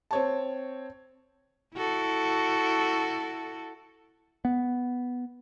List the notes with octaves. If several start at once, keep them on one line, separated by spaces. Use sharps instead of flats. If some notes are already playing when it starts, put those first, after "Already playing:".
C4 C#5 A5
E4 F#4 A4
B3